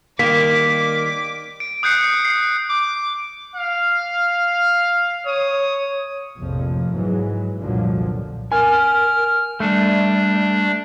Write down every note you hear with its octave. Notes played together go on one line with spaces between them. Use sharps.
D#3 G3 A#3 D6 B6
D7
D#6 F#6 G6 C7 C#7
C7
D6
F5
C#5 D#6
A#1 F2 A2 C3 F3
G#2 E3 F#3 G#3
C2 F2 A#2 D3 F3 F#3
A#4 G#5 F6
G3 A3 D4